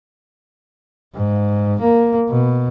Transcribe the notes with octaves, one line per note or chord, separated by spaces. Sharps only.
G#2
A#3
B2